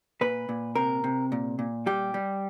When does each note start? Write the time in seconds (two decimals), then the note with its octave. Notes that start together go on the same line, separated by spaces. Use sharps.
0.21 A#2 B4
0.49 A#2
0.75 C3 A#4
1.04 C3
1.32 A#2
1.59 A#2
1.86 G3 G4
2.14 G3